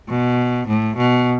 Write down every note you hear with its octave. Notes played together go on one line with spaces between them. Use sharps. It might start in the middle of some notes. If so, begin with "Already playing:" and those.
B2
A2
B2